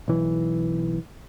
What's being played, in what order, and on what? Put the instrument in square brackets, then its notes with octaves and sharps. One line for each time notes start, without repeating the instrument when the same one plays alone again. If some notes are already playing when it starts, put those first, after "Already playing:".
[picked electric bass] B1 E3